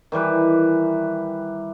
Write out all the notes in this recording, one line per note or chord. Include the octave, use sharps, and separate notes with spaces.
D#3 E3 G3 B4